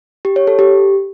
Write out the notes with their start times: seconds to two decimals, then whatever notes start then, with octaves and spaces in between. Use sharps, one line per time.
0.25 G4
0.36 C#5
0.47 A4
0.59 G4